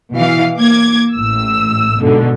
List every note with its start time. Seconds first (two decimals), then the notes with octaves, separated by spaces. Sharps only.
0.15 B2 E3 F5
0.57 A#3 D6 G#6
1.15 A1 A2 E6
2.00 G#2 B2 D3